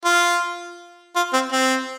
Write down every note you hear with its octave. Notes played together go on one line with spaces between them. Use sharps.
F4
F4
C4
C4